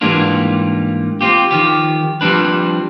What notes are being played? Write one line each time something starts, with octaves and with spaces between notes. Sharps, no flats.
G#2 E3 G3 A#3 D4 F4
C4 F4 G4
D#3 F3 G4
F3 G3 C4 D4 B4